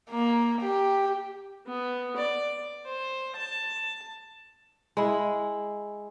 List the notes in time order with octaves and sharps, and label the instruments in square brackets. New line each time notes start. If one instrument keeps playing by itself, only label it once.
[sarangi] A#3
G4
[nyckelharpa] B3
D5
C5
A5
[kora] G#3 E4